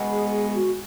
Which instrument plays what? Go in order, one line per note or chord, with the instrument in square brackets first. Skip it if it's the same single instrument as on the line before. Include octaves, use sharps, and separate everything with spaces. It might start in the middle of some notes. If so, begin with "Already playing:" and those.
Already playing: [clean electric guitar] B2 G#3 B3
[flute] G#4
G#4
F#4